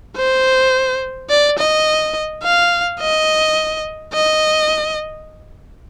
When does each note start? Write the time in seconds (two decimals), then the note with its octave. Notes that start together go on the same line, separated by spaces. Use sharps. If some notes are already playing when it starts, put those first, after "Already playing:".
0.17 C5
1.30 D5
1.58 D#5
2.43 F5
3.00 D#5
4.14 D#5